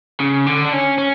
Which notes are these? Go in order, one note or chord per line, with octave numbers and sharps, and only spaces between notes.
C#3
D3
D4
C#4
C#4